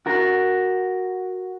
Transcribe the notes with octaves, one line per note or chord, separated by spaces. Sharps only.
F#4 A#4